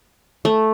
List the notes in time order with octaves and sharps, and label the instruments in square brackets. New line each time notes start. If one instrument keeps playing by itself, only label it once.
[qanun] A3